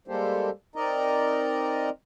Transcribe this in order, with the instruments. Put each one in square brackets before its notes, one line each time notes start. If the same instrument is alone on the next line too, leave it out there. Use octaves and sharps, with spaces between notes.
[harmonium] G3 G#3 A#3 G4 A4 C5
C4 D#4 A#4 D5 D#5 A#5